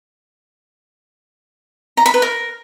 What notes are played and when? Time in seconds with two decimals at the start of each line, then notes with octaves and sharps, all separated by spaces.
1.97 A#5
2.06 B5
2.14 B4
2.22 A#4